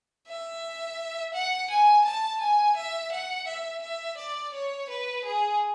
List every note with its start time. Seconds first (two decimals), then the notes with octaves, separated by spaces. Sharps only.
0.28 E5
1.34 F#5
1.70 G#5
2.05 A5
2.41 G#5
2.77 E5
3.12 F#5
3.47 E5
3.83 E5
4.17 D5
4.54 C#5
4.90 B4
5.24 G#4